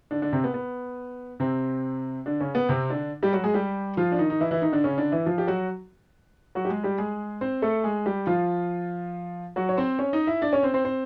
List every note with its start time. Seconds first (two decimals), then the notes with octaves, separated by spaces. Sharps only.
0.11 D3 D4
0.22 D3 D4
0.33 C3 C4
0.44 B3
0.54 B3
1.40 C3 C4
2.26 D3 D4
2.41 C#3 C#4
2.55 B3
2.69 C3 C4
2.90 D3 D4
3.23 G3 G4
3.33 F#3 F#4
3.44 G#3 G#4
3.54 G3 G4
3.97 F3 F4
4.12 D4
4.19 D#3 D#4
4.30 D#4
4.40 E3 E4
4.51 E3 E4
4.62 D#3 D#4
4.72 D3 D4
4.84 C#3 C#4
4.98 D3 D4
5.12 E3 E4
5.26 F3 F4
5.38 G4
5.47 F#3 F#4
6.55 F#3 F#4
6.65 G4
6.69 G#3 G#4
6.84 G3 G4
6.98 G#3 G#4
7.41 C4 C5
7.62 A3 A4
7.84 G#3 G#4
8.06 G3 G4
8.27 F3 F4
9.56 F#3 F#4
9.69 C#5
9.77 C4 C5
9.99 C#4 C#5
10.13 D#4 D#5
10.27 E4 E5
10.42 D4 D5
10.53 C#4 C#5
10.63 C4 C5
10.74 C4 C5
10.85 C4 C5